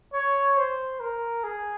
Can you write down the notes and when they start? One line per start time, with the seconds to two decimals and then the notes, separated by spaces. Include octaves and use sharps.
0.14 C#5
0.57 C5
1.00 A#4
1.44 G#4